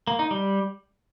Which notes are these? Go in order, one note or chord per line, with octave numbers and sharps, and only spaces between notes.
A#3
D#4
G3